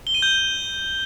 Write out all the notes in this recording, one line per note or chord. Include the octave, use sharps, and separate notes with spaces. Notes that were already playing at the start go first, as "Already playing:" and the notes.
G7
D#7
G6